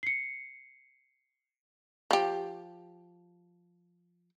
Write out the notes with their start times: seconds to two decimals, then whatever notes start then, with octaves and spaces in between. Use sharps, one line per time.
0.03 C7 C#7
2.11 F3 G4